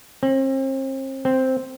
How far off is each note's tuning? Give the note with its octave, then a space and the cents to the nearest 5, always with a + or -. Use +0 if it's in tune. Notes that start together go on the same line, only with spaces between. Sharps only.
C4 +40
C4 +0